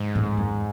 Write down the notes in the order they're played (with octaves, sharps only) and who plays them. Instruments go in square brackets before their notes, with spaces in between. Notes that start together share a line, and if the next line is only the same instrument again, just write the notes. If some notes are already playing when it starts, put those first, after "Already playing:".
Already playing: [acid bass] G#2
[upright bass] A2
F#2